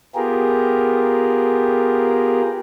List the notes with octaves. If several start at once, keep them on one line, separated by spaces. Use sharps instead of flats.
B3 F4 G4 G#4 A#4